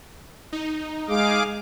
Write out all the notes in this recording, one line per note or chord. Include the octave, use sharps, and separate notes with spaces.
D#4
G#3 G#4 F5 D6